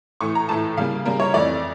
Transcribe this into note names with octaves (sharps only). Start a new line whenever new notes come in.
A2 E3 A3 C#6
A#5
A2 E3 A3 A5
C#3 G3 A#3 F5
C#3 G3 A#3 A#4
C#5
F2 E3 A3 D5